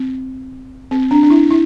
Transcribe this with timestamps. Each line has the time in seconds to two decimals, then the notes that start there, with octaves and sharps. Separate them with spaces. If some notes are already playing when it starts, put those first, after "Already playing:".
Already playing: C4
0.91 C4
1.11 D4
1.23 D4
1.30 E4
1.50 E4